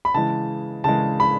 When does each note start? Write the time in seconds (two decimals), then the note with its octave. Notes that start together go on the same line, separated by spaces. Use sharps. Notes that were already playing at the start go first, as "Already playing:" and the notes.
0.05 B5
0.14 C#3 E3 G#3 A5
0.84 C#3 E3 G#3 A5
1.20 B5